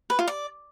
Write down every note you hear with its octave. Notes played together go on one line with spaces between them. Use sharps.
B4
F4
D5